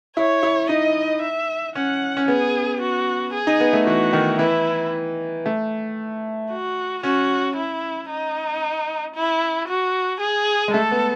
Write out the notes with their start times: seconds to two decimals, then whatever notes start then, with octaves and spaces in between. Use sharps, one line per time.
0.17 E4 C#5
0.43 E4
0.69 D#4 D#5
1.22 E5
1.75 C#4 F#5
2.17 C#4
2.28 B3 G#4
2.81 F#4
3.34 G#4
3.47 D#4
3.60 B3
3.73 A3
3.87 E3 F#4
4.13 D#3
4.39 E3 E4
5.46 A3
6.51 F#4
7.03 C#4 F#4
7.56 E4
8.09 D#4
9.15 E4
9.69 F#4
10.20 G#4
10.68 G#3
10.74 A3 A4
10.91 B3